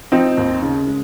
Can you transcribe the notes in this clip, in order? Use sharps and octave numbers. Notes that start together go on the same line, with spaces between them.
F3 C4 D#4
D#2
C#3
G#3